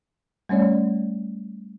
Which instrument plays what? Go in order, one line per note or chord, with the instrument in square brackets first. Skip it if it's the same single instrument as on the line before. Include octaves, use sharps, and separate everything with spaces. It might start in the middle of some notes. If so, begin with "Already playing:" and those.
[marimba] G3 A3 C#4 C#5 D5